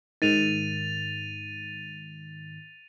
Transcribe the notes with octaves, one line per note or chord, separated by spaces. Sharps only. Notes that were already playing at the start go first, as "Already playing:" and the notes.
G#2 D#3 A6 D#7 F7